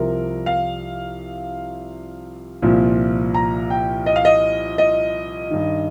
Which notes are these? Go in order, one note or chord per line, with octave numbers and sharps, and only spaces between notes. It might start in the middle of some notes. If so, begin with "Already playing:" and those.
Already playing: C2 C3 F3 A#4
F5
C2 A#2 F3
A#5
G5
D#5
F5
D#5
D#5
G2 D#3